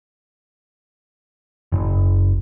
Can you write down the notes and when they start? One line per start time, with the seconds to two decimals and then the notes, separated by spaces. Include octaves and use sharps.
1.72 F#1